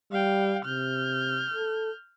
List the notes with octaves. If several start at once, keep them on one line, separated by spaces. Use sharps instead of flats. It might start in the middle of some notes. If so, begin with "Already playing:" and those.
G3 F5 G5
C3 F6 G6
A4